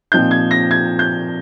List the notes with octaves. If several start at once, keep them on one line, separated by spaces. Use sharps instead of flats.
A#2 F3 C4 D#4 G6
G#6
A#6
G#6
G6